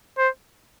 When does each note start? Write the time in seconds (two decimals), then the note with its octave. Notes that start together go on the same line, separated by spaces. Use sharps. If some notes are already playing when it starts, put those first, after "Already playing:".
0.18 C5